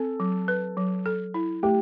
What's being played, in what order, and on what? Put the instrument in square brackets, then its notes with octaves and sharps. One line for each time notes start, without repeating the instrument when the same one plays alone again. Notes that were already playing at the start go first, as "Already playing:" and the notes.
Already playing: [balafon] C4 [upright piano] A4
[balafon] F#3
B4
F#3
A4
E4
[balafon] A3 [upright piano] G4